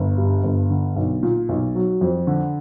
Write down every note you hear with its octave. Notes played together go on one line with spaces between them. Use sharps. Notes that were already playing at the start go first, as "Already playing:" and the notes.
Already playing: G1
G2
G1
D3
B1
A#2
B1
F#3
F2
D3